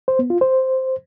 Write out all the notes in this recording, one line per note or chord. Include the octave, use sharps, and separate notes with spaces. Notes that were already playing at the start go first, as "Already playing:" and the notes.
C5
B3
F4
C5